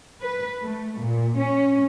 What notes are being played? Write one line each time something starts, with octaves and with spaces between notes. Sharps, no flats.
B4
A3
A#2
C#4